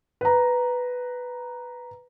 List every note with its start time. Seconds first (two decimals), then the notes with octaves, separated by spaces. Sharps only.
0.21 B4 A#5